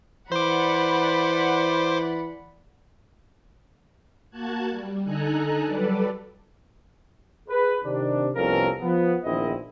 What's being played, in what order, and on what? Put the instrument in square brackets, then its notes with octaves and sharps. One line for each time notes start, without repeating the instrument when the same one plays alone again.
[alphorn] E3 [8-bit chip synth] C5 D6 [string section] D5 F#5 B5
[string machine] A#3 F#4 A5 F#6 G#6
G3
D3 D#4 A4 G#5 A#5 F#6
F#3 G3 A4 B4 D5
[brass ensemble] G#4 B4
C3 D#3 C4 D4
C2 F2 B3 C#4 A4 A#4
F3 B3
A#1 E2 D#3 C4 E4 D#5